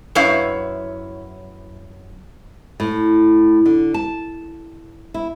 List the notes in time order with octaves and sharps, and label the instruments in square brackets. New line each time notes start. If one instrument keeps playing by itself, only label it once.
[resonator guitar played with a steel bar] F#2 E4 B4 C#5 F5
[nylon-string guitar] A2
D3
A5
E4